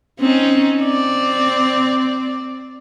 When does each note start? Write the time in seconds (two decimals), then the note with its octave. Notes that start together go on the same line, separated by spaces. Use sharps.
0.20 C4 C#4 D#4
0.83 C4 D5